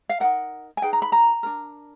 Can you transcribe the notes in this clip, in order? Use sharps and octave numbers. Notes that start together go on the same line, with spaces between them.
F5
D#4 F#4 A#4 F#5
G#5
D#4 G#4 B4 G5
A#5
B5
A#5
D4 F4 A#4